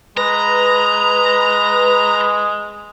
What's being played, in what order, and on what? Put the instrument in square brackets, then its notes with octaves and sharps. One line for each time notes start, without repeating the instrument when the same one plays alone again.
[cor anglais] G#3 [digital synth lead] B4 [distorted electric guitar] A#5